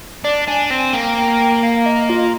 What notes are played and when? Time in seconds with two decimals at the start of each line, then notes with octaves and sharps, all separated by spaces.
0.24 D4 D5
0.47 D4 G#5
0.70 C4 G#5
0.93 A#3 G5
1.63 F5
1.86 D#5
2.09 F4